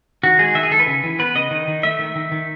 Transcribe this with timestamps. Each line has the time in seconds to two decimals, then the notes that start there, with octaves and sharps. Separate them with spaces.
0.23 D#3 F#4
0.39 G#3 G#4
0.55 D#3 E5
0.63 G#4
0.71 D#3 A4
0.80 B4
0.87 C#3
1.04 E3
1.19 B3 B4
1.35 C#3 D#5
1.51 D#3
1.68 D#3
1.83 A3 E5
1.99 D#3
2.16 D#3
2.31 D#3